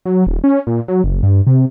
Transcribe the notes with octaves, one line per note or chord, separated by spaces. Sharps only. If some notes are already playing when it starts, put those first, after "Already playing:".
F#3
D#1
C#4
A#2
F#3
F#1
G2
C3